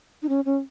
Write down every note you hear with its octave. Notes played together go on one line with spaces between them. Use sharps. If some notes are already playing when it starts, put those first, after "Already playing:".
D#4
C#4
C#4